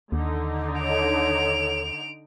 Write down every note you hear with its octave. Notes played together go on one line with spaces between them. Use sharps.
D#2 D3 D#4
A4 C#5 D7 F7